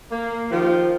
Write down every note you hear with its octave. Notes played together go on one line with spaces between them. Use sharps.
A#3
D#3 F3 F4 G4